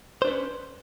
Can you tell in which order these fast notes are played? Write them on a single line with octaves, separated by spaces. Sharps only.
C5 D4 B4 C#4